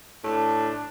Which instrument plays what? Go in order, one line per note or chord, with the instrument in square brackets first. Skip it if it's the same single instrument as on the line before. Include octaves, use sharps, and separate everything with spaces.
[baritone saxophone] A2 [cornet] D4